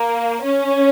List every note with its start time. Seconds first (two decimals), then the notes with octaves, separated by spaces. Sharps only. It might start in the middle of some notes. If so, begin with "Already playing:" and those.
Already playing: A#3
0.42 C#4